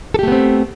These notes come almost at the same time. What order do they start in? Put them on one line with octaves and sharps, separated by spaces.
A4 G4 A3 B3 C4